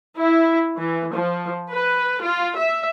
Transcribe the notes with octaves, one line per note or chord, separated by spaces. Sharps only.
E4
E3
F3
B4
F4
E5